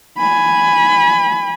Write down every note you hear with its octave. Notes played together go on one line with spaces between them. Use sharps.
G#5 B5